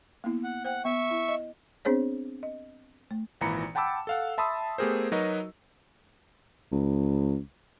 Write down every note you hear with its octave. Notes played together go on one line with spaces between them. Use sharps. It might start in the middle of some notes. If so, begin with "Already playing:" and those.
A#3 B3 E4
F#5
C5 F#5 G5
B3 E5 C#6
E4
D#5
B3 C4 D4 G#4 C5 C#5
D#5
A3
G#1 A#2 E3 A#5 B5 C#7
F#5 G5 A5 B5 D6 E6
A4 F5 F#5
E5 A5 B5 C6 D#6 E6
A3 B3 G4 G#4 A#4 C5
F#3 D#4 F#4 A#4 B4 D#5
C#2